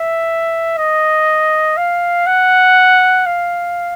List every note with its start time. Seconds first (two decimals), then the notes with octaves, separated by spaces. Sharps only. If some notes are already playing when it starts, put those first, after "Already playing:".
Already playing: E5
0.78 D#5
1.77 F5
2.27 F#5
3.26 F5